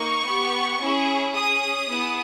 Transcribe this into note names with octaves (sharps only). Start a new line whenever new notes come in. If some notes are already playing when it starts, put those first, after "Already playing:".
Already playing: A#3 D#4 C#6
B3 G4
C#4 E4 G#4
C#4 G#4 D#6
B3 E4 G#4